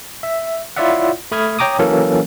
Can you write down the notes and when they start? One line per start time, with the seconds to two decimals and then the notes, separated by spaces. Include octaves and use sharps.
0.23 E5
0.76 E4 F4 C#5 D5 E5 F#5
1.32 A3 B5 D#6 F6 G#6
1.59 C#5 G5 A#5 D6 D#6
1.79 E3 F#3 A#3 C#4 A4 A#4